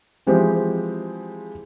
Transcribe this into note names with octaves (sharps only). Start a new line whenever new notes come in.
E3 F3 G#3 C4 G4